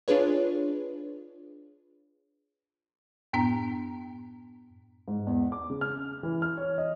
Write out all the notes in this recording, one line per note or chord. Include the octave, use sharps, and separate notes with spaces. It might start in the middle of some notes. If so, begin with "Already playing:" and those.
D4 F4 G#4 B4 C#5
F#2 A2 B3 D4 G5 A#5
G#2
E2
D6
C#3
F6
E3
F6
C#5
D#5